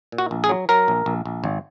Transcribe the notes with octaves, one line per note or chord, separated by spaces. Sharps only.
A#2
F#4
A#1
G#4
F#3
F#3 A#4
A#1
A#1
A#1
G#1